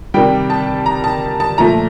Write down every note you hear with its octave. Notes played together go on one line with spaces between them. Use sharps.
C3 D#3 G3 G5
A5
A#5
A5
A5
A#2 F3 A3 A#5